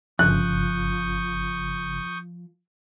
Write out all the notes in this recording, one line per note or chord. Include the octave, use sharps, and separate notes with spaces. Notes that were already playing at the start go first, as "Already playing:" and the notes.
G1 C#3 F3 C#6 D#6 F#6 G6